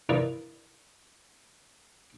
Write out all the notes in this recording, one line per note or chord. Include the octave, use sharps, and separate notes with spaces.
E4 F4 G#4 A#4 B4 D5